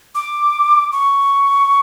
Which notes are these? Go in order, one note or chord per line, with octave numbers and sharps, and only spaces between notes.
D6
C#6